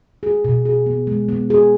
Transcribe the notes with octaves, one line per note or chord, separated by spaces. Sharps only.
G#4
B2
G#4
B3
G#3
B3
G#4